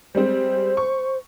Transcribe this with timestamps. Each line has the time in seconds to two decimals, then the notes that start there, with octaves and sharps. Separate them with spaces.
0.15 G3 G#3 C4 C5
0.77 C#6